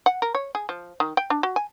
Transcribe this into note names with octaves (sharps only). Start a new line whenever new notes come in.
F#5
A#4
C#5
G#4
F3
D#3
G5
D4
F#4
G#5